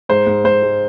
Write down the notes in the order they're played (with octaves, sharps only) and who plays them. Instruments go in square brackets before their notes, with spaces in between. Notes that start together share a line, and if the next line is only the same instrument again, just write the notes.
[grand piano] G#2 C5
G#2
G#2 C5
G#3